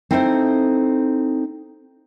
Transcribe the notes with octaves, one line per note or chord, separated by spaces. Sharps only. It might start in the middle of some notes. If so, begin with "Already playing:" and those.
C4 D#4 E4 A4 A#4 C5